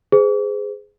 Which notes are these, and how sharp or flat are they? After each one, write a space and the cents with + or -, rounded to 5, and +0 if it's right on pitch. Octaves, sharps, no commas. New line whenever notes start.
G#4 +0 C5 -40